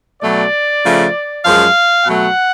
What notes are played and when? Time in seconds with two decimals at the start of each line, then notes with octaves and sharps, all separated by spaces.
0.23 B2 F#3 A3 D5
0.84 C#3 F3 A3
1.45 F#2 F3 G#3 F5
2.05 B2 F#3 A3 F#5